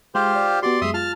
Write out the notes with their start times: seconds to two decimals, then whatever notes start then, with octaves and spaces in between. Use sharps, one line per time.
0.15 G#3 F4 G4 C5
0.35 D5
0.63 B3 F#4 G4 D5 C6
0.81 F#2 G#3 E5 C6 D#6
0.94 F4 A5 F6